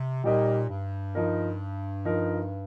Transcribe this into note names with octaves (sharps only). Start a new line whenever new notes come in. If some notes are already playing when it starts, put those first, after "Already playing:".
Already playing: C3
A#2 G3 D#4 G4 A#4 D#5
G2
F3 D#4 A#4
F3 D#4 A#4